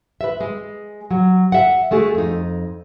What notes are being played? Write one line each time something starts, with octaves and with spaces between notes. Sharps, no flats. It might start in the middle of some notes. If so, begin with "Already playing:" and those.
B4 E5
G#3
F#3
E5 F#5
G#3 A3 F#4 G#4
F2 D#4